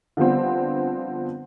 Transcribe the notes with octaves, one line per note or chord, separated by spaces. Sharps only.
D3 F3 G3 B3 C4